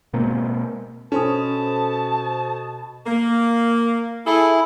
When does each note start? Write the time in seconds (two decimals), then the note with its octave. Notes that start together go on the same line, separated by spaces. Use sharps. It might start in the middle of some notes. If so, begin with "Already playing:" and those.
0.13 B2 G#3 A#3 C4
1.12 B2 C#4 A4 C5 A5 D#6
3.06 A#3
4.26 E4 G#4 A4